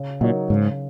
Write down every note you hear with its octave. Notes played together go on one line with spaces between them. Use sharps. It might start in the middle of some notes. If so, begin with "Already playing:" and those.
Already playing: C#3
A#2 F#3 D#4 A#4 C#5
G#2 C#3